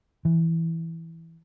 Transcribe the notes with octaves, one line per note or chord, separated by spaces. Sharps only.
E3